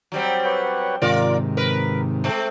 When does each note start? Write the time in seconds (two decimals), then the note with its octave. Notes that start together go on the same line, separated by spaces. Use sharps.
0.12 F#3 G3 C4
0.45 B4 C#5 F#5
1.02 G#2 C3 D#3 F4 A#4 D5
1.57 A#4 B4
2.24 G#3 A3 C4